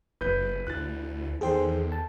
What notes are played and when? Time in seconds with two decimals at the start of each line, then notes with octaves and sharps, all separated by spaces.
0.21 F#1 B4 G6
0.67 D2 E4 F#6 A6
1.41 E2 D#3 G#4 A4 C5 G5 C6
1.92 A5